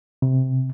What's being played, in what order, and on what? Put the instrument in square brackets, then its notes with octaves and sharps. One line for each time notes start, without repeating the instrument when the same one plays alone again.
[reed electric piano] C3